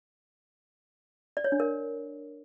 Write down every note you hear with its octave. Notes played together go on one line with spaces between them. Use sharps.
D5
C#5
D4
A#4